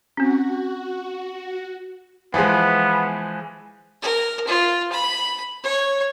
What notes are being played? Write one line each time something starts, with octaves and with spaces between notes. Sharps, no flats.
C4 C#4 F#4
E3 F3 G#3 B3
A#4
F4
B5
C#5